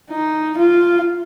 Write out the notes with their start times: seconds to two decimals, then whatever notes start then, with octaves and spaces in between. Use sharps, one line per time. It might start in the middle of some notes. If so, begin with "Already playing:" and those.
0.11 D#4
0.58 F4